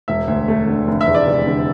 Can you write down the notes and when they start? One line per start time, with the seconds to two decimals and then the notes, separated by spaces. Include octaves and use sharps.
0.08 E1 E5
0.28 D2
0.48 A3
0.67 D3
0.87 F1
1.01 E5
1.07 E2
1.15 D5
1.27 F1
1.47 D3